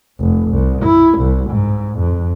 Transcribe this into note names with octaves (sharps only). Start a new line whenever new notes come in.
F1
C2
E4
C2
G#2
F2